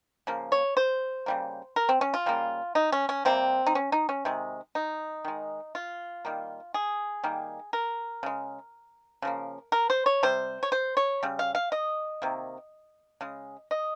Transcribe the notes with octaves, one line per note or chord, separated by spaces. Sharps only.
C#3 F3 A#3
C#5
C5
C#3 G3 A#3
A#4
C4
C#4
F4
C#3 G3 A#3
D#4
C#4
C#4
C3 G3 A#3 C4
D#4
C#4
D#4
C#4
C3 D#3 G#3
D#4
D#3 G#3
F4
D#3 G3 A#3
G#4
D#3 G3 A#3
A#4
C#3 G#3
C#3 F3 A#3
A#4
C5
C#5
C3 G3 C5
C#5
C5
C#5
C#3 G3
F5
F5
D#5
C3 D#3 A#3
C#3 G#3
D#5